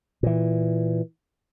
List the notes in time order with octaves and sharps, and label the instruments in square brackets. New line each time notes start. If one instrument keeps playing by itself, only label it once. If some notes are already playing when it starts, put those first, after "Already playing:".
[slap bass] A#2 E3